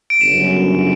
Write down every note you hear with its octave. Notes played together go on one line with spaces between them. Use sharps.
D7
G1 F#2 C#3 E7